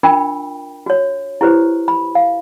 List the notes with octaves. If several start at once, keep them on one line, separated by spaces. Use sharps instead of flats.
D4 F4 A#4 G5 B5
F#4 C#5
E4 G4 B4 C5
B5
F5